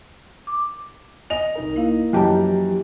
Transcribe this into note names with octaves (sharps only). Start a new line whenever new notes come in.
D6
D#5 G#5 F7
C2 D#4 A#4
A#3 E4 F5
F#2 E3 F3 G4 D#5 A5 A#5